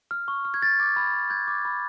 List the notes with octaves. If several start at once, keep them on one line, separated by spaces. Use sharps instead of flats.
F6
C#6
F6
G#6
G6 A6
D6
B5
B5
G6 G#6
D6
B5